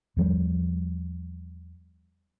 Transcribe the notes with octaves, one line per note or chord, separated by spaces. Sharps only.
E2 F3 G3